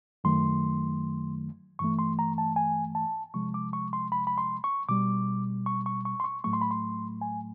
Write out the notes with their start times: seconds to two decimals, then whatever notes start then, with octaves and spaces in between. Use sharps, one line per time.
0.24 F#2 D#3 F#3 A3 C6
1.79 G2 E3 A3 C#6
1.99 C6
2.19 A#5
2.38 A5
2.56 G#5
2.95 A5
3.34 C3 F3 G#3 C#6
3.54 D6
3.73 C#6
3.93 C6
4.12 B5
4.27 B5
4.38 C6
4.64 C#6
4.89 B2 G3 D6
5.66 C#6
5.86 C#6
6.05 C#6
6.20 C6
6.24 C#6
6.44 A2 F#3 A3 C#6
6.53 C6
6.61 B5
6.71 C6
7.21 G#5